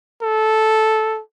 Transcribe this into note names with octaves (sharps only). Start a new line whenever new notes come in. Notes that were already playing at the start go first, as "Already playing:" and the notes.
A4